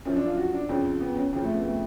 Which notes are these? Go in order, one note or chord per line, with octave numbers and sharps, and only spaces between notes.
F#2 F3 C#4
D4
F4
F#4
D4
F2 C#3 F3 C#4
B3
C#4
F2 C#3 F3 C#4
A3
B3
A3